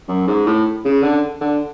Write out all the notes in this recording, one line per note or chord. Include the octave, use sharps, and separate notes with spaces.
F#2
G#2
A2
C#3
D3
D3